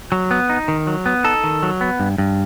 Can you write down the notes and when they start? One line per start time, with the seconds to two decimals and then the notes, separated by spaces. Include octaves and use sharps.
0.12 F#3
0.31 B3
0.50 D#4
0.68 D#3
0.87 F#3
1.06 B3
1.24 D#4 A4
1.44 D#3
1.63 F#3
1.81 B3
2.00 G2
2.18 G2